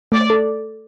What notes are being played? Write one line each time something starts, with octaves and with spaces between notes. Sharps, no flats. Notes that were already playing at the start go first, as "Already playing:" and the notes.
A3 D5
A4